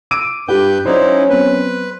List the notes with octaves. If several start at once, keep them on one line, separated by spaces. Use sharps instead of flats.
D6 E6 D7 D#7
G2 G4 B4 G6
F#3 C#4 D#4 E4 C5 D5
F#3 B3 C4 B4